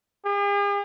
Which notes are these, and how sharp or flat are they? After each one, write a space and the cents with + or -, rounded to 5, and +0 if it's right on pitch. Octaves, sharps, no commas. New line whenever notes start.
G#4 -45